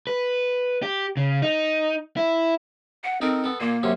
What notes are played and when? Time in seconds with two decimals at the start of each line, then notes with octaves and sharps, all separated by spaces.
0.07 B4
0.82 G4
1.17 C#3
1.42 D#4
2.17 E4
3.04 F#5
3.21 C4 D#4 A4 A#4
3.44 B3 A4
3.61 A#2 A#3
3.83 F#2 C3 C#4